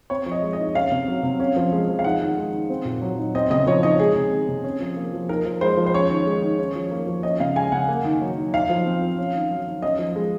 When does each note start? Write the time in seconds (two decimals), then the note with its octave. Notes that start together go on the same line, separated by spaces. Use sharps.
0.10 C4 C#5
0.26 F3
0.32 D#5
0.42 G#3
0.53 D#5
0.59 D#4
0.75 C#4 F5
0.91 C3
1.08 F#3
1.23 C3
1.40 C#4
1.56 F3
1.72 G#3
1.89 F3
1.99 F5
2.04 D#4 F#5
2.21 D#3
2.37 G#3
2.53 D#3
2.70 C4
2.85 A#2
3.02 F#3
3.18 D#4
3.34 C4 D#5
3.50 C#3 D#5
3.67 F3 C#5
3.83 D#4 D#5
4.00 G#3 G#4
4.15 C3
4.32 D#3
4.49 C3
4.64 C#4
4.80 F3
4.96 A#3
5.13 F3
5.29 D#4 A#4
5.45 F3
5.61 G#3 C5
5.77 F3
5.86 C5
5.94 C#4 C#5
6.10 D#3
6.26 G#3
6.42 D#3
6.59 C#4
6.75 F3
6.91 A#3
7.07 F3
7.23 C#4 D#5
7.40 C#3 F5
7.56 G#3 G#5
7.72 C#3 F#5
7.88 A#3
8.04 D#3
8.21 F#3
8.38 D#4
8.53 D#4 F5
8.70 F3
8.86 C4
9.02 F3
9.18 C#4
9.35 D#3
9.51 F#3
9.67 D#3
9.82 C#4 D#5
9.99 F3
10.16 G#3